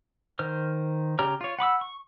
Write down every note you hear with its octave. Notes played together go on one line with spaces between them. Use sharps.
D#3 C5 F6
C#3 G4 C#5 A#5 F6
F4 C#5
F#5 B5 D6 E6
C#6